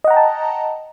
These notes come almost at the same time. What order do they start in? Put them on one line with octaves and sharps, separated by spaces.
D#5 F#5 A#5 G5 A5